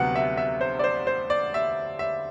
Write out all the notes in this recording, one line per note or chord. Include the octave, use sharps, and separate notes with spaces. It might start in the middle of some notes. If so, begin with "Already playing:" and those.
Already playing: D2 C3 F#3 B3 F#5
E5
E5
C5
D5
C5
C5
D5
E5
E5